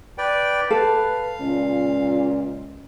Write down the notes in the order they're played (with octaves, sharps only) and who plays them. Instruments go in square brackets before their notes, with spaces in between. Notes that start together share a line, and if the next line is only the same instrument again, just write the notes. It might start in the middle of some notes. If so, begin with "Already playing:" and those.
[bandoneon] B4 D5 G5
[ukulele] A4 [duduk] B4 [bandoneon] F5
[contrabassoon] C#2 [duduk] A#2